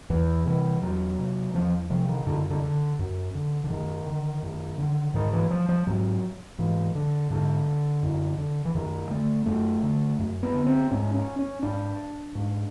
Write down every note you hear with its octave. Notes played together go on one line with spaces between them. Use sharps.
E2 E3
C3 E3
E2 F#3
C3
E2 F3
C3 F3
D#3
F#2 D3
D3
D3
F#2
D3
D3
F#2 D#3
D3
F#2
D3
G#2 D#3
E3
F3
F3
G#2 F#3
G#2 E3
D3
G#2 D3
F#2
D3
E3
F#2 D#3
D3 A3
F#2 A3
D3
F#2
B3
D3
C4
G#2 C#4
C#4
C#4
G#2 D4
G#2